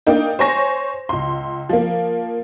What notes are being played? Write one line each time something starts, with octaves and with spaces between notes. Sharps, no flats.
A#3 D4 D#4 G5
C5 C#5 G#5 C#6 A#6
C#2 C6
F3 A#3